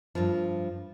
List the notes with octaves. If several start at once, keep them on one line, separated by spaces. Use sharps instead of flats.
G2 F3